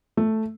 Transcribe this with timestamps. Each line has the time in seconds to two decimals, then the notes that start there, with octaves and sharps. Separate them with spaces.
0.17 A3